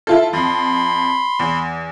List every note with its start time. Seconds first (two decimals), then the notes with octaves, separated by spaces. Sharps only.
0.07 E4 F4 A4
0.33 F2 B5 C6
1.39 E2